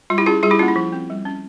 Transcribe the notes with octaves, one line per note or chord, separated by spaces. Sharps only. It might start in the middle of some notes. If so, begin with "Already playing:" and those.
G3 F4
E4 G4
C#4 F4 G#4
G3 F4 G#4
E4 G4
A#3 C#4 F4
E4
F3
C4
G3
C#4